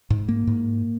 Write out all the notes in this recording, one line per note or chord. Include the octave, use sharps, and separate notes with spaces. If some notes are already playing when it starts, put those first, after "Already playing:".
G#2
A#3
G#2